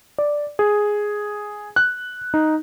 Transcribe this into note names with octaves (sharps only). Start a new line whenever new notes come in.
D5
G#4
F#6
D#4